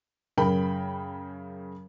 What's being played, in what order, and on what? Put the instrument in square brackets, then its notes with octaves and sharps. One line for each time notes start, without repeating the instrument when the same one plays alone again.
[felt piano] F#2 C#3 A#4 G5 B5